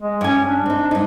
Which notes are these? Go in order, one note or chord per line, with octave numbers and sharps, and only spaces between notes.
G#3
G2 C#4 G#5
D4
C4 D#4
G2 D#4